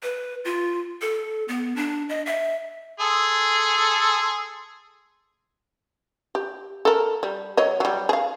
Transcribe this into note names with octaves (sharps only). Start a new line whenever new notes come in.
B4
F4
A4
B3
D4
D#5
E5
G#4 A4 C6
G4
A4 A#4
G3
F#3 C#5 D#5
F#3 G3
G#4 F5